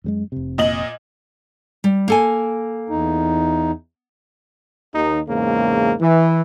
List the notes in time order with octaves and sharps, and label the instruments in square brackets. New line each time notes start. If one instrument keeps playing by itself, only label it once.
[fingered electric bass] F#2 G3 G#3
F1 C3
[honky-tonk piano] A#2 D#5 F#7
[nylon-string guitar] G3
A#3 A4 G#5
[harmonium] E2 D#4
[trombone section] D#2 D#4
E2 G#2 C#3 A#3
E3